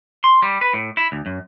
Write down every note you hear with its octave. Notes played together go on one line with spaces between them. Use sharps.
C6
G3
B4
A2
E4
D2
F#2